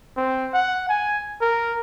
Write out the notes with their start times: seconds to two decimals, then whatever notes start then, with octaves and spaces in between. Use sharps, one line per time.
0.17 C4
0.54 F#5
0.89 G#5
1.41 A#4